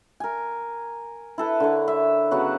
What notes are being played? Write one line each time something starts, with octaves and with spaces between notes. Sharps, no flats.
A#4 G#5
E4 A4 B4
D3 A#4 C#5
E5
C#3 F#3 B3 F#5